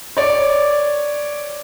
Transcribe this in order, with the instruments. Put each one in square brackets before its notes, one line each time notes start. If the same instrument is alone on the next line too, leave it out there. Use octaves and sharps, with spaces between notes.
[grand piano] C#5 D5